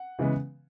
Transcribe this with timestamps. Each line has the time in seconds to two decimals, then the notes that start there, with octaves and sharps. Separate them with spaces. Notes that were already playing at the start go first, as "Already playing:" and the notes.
Already playing: F#5
0.19 C#3 E3 G#3 B3